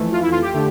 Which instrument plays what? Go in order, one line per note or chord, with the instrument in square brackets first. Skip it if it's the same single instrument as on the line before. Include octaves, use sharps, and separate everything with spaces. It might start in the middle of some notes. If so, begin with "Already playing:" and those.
Already playing: [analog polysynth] F2 E3 A3
F4
E4
F4
G4
D3 A3